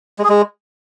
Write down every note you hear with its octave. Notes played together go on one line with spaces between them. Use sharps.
G#3
G#4
G#3